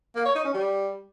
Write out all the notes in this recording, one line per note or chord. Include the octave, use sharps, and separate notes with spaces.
A#3
C#5
D#4
C#4
G3